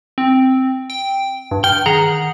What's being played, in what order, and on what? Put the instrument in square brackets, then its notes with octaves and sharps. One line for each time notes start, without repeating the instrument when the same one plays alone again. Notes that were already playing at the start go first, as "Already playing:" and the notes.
[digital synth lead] C4
G5
G2
[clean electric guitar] G5 [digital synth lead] F6
[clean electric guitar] D#3 F#5 A#5 [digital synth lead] G#4